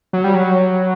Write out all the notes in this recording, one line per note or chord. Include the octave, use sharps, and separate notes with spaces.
F#3
G3
F#3